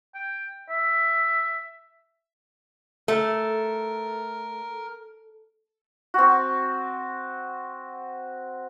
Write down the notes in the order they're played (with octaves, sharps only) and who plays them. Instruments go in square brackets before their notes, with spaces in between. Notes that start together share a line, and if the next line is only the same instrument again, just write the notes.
[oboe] G5
E5
[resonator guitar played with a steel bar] A3 [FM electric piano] A4 [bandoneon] A#4
[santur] C4 F#4